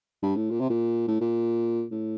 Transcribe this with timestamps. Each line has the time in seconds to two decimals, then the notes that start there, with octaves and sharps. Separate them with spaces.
0.23 G2
0.36 A2
0.51 A#2
0.60 C3
0.70 A#2
1.08 A2
1.21 A#2
1.92 A2